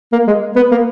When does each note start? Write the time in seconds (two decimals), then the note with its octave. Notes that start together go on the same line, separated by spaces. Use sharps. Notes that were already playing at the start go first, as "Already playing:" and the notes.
0.12 A#3
0.27 G#3
0.56 B3
0.71 A#3